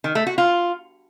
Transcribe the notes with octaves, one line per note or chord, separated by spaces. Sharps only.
D#3
A3
F#4
F4